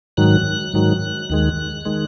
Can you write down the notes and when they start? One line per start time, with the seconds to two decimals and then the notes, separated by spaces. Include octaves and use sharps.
0.17 G#2 D#3 F#3 F#6
0.74 G#2 D#3 F#3
1.30 D#2 D#3 G#3
1.85 D#3 G#3